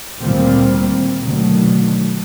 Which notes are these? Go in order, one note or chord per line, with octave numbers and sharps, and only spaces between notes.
D2 A#2 D#3 G3 C4
B2 D3 D#3 F#3 A3